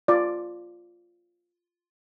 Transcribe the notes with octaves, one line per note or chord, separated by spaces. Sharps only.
F4 D5